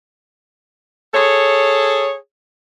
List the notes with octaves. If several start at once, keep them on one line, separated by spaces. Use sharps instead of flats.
G#4 A4 C#5